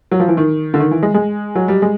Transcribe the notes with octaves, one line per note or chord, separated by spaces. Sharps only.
F#3
F3
E3
D#3
D3
D#3
E3
G#3
G#3
F#3
G3
G#3